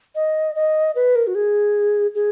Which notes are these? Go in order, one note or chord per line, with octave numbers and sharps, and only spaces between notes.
D#5
D#5
B4
A#4
F#4
G#4
G#4